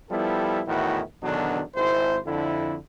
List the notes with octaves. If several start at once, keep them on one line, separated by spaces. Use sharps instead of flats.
F3 G3 B3 E4 G4 A4
E2 A2 D#3 E3 E4 F#4
E2 B2 D3 D#3 F#3 D4
G#1 E4 C5
F2 D3 E4